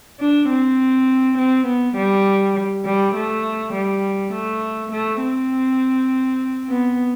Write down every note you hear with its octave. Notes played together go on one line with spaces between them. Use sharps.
D4
C4
C4
B3
G3
G3
A3
G3
A3
A3
C4
B3